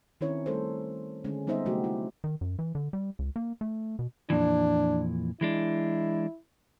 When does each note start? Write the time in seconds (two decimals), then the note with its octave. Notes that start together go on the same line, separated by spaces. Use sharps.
0.21 D#3 C4 C#4 E4 A#4 C#5
0.46 G3 A3 A4 A#4 C5
1.24 D3 G#3 C#4
1.47 G3 B3 D#4 C5 D#5 E5
1.65 C3 F#3 A3 F#4 G4
1.84 E4
2.24 D#3
2.41 F#2
2.59 E3
2.75 D3
2.93 G3
3.19 C#2
3.36 A#3
3.61 A3
3.99 B2
4.30 F2 A#2 E3 D4
5.41 E3 G#3 D4 E4